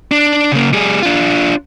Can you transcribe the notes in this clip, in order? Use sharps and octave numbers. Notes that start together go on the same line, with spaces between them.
D4
C#3 A#3
G3 G#4
D4 F4